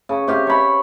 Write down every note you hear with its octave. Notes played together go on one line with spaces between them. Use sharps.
C#3
C3 G4 F5
C#5 B5